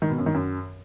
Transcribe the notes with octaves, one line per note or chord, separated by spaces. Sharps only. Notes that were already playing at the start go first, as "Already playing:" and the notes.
D#3
B2
F#2
D#3
F#2